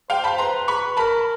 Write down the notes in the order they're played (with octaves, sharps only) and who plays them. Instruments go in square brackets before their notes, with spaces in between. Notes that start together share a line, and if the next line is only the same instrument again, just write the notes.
[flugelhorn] C5 [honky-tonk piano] F5 G5
[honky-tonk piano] A5 B5
[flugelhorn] B4 [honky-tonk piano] A#5 C6
[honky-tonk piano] B5 C#6
[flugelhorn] A#4 [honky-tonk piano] A5 B5